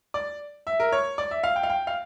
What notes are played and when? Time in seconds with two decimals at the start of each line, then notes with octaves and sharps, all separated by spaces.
0.14 D5
0.67 E5
0.80 A#4
0.92 C#5
1.18 D5
1.31 E5
1.44 F5
1.56 G5
1.63 F5
1.69 G5
1.87 F5